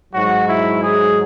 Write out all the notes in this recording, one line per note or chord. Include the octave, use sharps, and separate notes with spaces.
G#2 F#3 F#4
E4
G#4